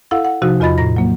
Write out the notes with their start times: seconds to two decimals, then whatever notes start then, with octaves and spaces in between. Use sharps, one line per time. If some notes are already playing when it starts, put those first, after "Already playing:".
0.11 E4 A4 F5 F#5
0.25 F#5
0.42 C3 F3 D#4 F#4
0.60 E2 F4 D#5 B5 A6
0.78 A2 A#5 A#6
0.96 F#3 A#3